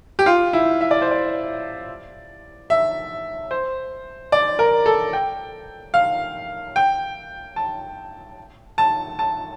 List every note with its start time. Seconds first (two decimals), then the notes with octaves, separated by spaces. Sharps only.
0.19 G4
0.26 F4
0.53 E4
0.81 E5
0.91 D5
1.02 C5
1.11 D5
2.70 E5
3.51 C5
4.32 D5
4.59 A#4
4.86 A4
5.13 G5
5.94 F5
6.76 G5
7.56 A5
8.78 A5
9.19 A5